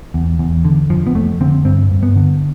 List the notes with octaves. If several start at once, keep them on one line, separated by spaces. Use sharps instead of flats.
E2
E2
D3
F2 F3
B3
F2 A3
D3 C4
G2 C4
G2
B3
D3